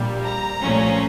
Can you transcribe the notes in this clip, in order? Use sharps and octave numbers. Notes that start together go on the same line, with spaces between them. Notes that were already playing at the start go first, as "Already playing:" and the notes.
Already playing: A#1 A#2 G3
A#5
C2 A#2 F3 A3 C#4